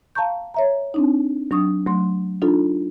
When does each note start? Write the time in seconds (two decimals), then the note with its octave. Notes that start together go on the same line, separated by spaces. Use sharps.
0.15 F5 A5 A#5 C#6 G6
0.54 C#5 E5 A#5
0.94 C4 D4 D#4
1.51 F#3 D4 C#6 D#6
1.87 F#3 A3 C6
2.42 D4 D#4 F4 A4